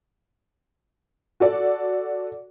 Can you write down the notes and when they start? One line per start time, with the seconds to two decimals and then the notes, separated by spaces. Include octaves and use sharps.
1.40 F#4 A4 D5